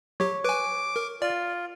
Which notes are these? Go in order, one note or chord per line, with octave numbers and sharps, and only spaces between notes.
F#3 G4 C#5
B4 G#5 D6
A#4
F4 D5